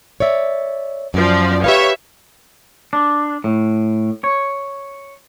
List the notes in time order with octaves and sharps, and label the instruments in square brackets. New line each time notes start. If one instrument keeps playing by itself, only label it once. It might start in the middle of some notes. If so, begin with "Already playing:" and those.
[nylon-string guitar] C#5 D5 E5
[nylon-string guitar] F#2 [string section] F3 D5
[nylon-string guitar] G4 B4 F5 [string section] C#5 E5
[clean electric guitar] D4
A2
C#5